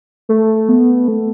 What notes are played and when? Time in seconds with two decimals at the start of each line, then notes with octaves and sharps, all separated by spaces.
0.29 A3
0.69 B3
1.08 A3